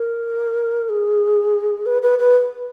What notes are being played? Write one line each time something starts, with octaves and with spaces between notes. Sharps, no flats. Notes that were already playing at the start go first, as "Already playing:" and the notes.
Already playing: A#4
G#4
B4
B4
B4